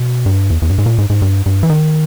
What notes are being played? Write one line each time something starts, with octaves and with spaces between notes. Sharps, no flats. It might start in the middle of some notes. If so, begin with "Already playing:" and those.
Already playing: B2
G2
E2
E2
G2
G#2
A#2
G#2
G#2
G2
G2
E3
D#3